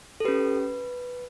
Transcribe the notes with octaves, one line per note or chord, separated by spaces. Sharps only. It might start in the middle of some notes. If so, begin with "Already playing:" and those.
A4
C#4 G4 B4